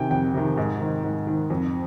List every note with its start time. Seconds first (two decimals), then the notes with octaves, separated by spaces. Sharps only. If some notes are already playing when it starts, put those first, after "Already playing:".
Already playing: C3 D#3 G5 G#5
0.11 F2 G5
0.34 C3 D#3
0.57 G#2
0.80 D#3
1.04 G#2
1.27 D#3
1.50 F2